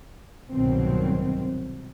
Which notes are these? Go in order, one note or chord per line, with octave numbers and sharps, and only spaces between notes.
C2 G#2 B2 D#3 F#3 C4